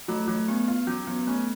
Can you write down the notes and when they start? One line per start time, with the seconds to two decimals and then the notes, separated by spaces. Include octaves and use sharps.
0.08 F#3 A3
0.28 F#3 A3
0.48 B3 C#4
0.68 F4
0.87 F#3 C#4
1.08 F#3 B3
1.27 A3 C#4